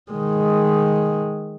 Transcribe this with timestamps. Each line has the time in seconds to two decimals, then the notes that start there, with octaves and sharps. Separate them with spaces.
0.12 D#3 G#3